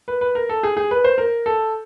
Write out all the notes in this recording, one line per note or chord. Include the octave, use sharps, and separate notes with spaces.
B4
B4
A#4
A4
G#4
G#4
B4
C5
A#4
A4